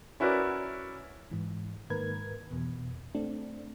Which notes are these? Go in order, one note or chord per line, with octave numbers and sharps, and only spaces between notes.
C#4 E4 F#4 A#4 B4 D5
G#2 E3
G#2 D#3 A#3 A#4 B4 G#6
E2 B2
A3 C4 D4